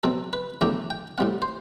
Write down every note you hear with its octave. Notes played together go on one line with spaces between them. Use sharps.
B2 F#3 C4 A4
B4
E2 D3 F#3 A3 D4 G5
G5
A2 G3 C4 F#5
C5